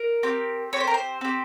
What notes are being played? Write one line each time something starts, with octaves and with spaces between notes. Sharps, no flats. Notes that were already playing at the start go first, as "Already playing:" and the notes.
Already playing: A#4
C4 G4
C4 G4 C#5
C5
A#4
C5
C4 G4